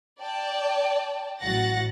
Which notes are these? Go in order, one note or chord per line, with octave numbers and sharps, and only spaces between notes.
D5 G5 A5
A1 F#3 F#4 F#5 A6 A#6